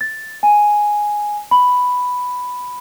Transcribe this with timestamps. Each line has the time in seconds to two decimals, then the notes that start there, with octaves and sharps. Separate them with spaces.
0.01 A6
0.43 G#5
1.51 B5